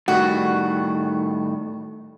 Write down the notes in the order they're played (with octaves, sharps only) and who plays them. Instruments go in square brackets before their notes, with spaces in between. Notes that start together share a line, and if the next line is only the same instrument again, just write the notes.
[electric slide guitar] A2 D#3 G3 [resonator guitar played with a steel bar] F#4